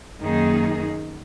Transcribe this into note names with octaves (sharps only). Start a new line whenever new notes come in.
F#2 D#3 A#3 D#4 G#4